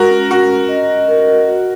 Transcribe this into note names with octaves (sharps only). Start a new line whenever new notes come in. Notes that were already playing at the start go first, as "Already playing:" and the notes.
Already playing: G#3 F#4 A#4
C#4
C#4 F#4
C#4
D#5
D#5
A#4
F#4
F#4